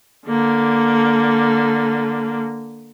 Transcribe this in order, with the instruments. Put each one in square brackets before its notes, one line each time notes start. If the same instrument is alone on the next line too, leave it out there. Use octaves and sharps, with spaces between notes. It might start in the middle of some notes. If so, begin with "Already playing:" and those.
[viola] D3 A#3